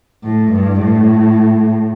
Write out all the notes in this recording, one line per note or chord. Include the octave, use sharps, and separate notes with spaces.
A2
G2
A2